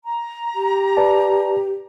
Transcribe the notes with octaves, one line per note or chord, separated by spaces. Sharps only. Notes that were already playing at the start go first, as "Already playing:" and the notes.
A#5
G4
B4 D5 A5